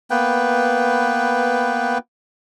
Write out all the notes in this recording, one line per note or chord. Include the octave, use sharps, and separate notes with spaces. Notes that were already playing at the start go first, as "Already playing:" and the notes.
A#3 B3 B4 G5